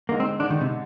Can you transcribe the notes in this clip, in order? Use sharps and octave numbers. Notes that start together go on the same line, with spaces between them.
D3 G#3 A#3 D#4
C4
D3 G#3 D4 D#4
D#3
C3